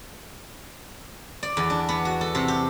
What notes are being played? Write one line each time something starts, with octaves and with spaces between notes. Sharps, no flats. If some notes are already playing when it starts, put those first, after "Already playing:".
D5
E2
D4
B3
F#4
A4
C3
G4